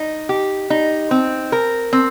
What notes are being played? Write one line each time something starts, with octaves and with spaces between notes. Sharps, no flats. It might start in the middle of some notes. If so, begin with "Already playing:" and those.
Already playing: D#4
G4
D#4
C4
A#4
C4